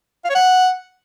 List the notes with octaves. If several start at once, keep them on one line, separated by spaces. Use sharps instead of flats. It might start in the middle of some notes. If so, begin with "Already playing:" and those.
F5
C#5
F#5